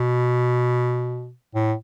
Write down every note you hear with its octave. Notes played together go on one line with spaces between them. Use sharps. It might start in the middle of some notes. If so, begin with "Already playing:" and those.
Already playing: B2
A2